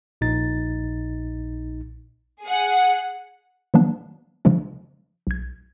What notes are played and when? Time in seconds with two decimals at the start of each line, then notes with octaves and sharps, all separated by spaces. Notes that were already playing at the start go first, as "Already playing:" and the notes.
0.21 A#1 A#2 D#4 A6
2.44 G#4 F#5
3.74 D#3 F3 F#3 A#3 B3 D4
4.45 C#3 F3 G#3 D4
5.27 B1 G#6